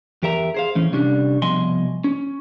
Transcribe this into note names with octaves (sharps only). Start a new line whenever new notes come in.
E2 G4 A#4 E5 A#5
G#4 C5 F5
A2 E3 C#4
C3 G3 C#4 D4
C2 B2 F3 D#5 G#5 C6
C#4